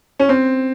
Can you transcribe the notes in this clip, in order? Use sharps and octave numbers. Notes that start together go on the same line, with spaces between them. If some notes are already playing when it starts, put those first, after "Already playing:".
C#4
C4